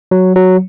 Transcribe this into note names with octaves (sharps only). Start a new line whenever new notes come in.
F#3
F#3